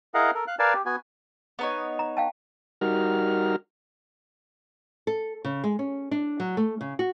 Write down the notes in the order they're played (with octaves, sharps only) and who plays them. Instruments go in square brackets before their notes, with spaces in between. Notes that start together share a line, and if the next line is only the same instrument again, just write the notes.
[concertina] E4 G#4 A#4 D#5 F5 F#5
A4 A#4
F5 F#6
A#4 B4 D5 F5 G#5 A5
G4
B3 F#4 G#5
[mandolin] B3 D#4 C#5
[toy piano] A#5
F5 G5 A5
[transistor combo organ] G3 D#4 F#4 A#4 F6
[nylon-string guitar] A4
C#3
G#3
C#4
D4
F#3
A3
C#3
F#4